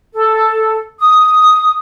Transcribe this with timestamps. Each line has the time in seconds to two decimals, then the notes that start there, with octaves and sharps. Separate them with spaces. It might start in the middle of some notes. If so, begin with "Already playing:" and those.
0.13 A4
0.99 D#6